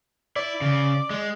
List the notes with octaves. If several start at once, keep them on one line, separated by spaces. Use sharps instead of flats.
E4 D5
C#3
G#3